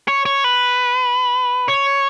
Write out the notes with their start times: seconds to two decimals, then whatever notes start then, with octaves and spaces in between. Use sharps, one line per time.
0.08 C#5
0.26 C#5
0.44 B4
1.68 C#5